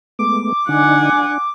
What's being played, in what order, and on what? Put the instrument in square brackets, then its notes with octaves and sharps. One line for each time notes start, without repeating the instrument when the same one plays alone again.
[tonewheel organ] G#3 A3 B3 [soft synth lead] D6
[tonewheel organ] D3 D4 D#4 [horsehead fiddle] F#5 G#5
[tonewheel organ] D4